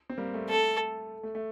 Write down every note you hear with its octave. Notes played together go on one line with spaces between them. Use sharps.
C4
G3 A#3
A3
A4
A3
A3